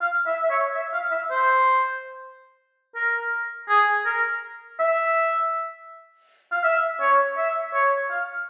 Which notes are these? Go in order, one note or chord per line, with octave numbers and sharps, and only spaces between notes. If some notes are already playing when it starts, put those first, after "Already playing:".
F5
E5
E5
C#5
E5
F5
E5
C5
A#4
G#4
A#4
E5
F5
E5
C#5
E5
C#5
F5